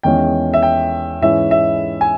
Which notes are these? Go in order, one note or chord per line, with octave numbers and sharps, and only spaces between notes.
E2 D#3 G#3 C#4 E4 G5
E5
G5
G#2 E3 G#3 C#4 E4 E5
E5
G#5